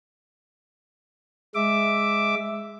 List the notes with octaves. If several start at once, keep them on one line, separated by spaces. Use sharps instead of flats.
G#3 E5 D6